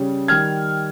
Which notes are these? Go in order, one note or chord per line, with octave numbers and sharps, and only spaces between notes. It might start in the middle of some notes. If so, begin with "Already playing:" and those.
Already playing: C#3 G3 C#4
D#3 G3 F6 G#6